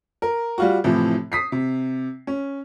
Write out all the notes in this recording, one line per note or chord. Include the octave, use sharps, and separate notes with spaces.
A#4
G3 F4 F#4
A2 C3 E3 F3
D#6 B6 C7
C3
C#4